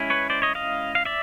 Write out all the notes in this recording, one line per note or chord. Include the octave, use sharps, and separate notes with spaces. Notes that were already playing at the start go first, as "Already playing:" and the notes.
Already playing: G#3 C#4 E4
B4 C#5
C5 D5
C#5 D#5
D#5 F5
F5
D5 E5